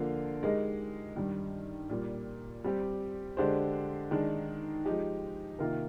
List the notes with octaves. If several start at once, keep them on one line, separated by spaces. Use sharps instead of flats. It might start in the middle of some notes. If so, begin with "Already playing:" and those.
Already playing: D3 F3 A#3 F4 A#4
G#3 D#4 G4 A#4 D#5
G2 D#3 G3
A#2 G3 A#3
G3 C4 G4
D3 G#3 D4 G4 C5
D#3 G#3 D4
F3 G#3 D#4 G4
C3 D#3 A#3 F4 A#4